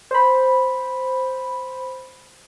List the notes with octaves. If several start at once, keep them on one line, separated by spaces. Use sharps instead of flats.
C5 B5